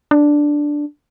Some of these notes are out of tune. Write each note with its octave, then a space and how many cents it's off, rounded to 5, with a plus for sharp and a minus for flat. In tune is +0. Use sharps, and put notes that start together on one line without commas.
D4 +0